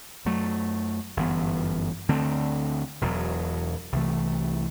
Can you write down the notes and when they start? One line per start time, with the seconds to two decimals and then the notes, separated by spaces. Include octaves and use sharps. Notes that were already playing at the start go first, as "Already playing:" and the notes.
0.25 F#2 F#3 A3
1.17 G1 F#2 E3 B3
2.09 D2 D3 A3 C4
3.01 E1 E2 B2 F#3
3.92 C2 C3 E3 A3